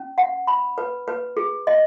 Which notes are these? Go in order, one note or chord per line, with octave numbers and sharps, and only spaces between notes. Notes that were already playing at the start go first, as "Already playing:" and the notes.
Already playing: C#4
F#5
B5
B4
B4
G#4
D#5